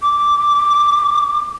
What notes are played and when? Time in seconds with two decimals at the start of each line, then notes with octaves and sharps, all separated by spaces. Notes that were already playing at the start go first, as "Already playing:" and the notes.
0.02 D6